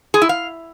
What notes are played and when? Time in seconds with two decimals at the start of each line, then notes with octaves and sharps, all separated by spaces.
0.14 G#4
0.22 E4
0.29 F5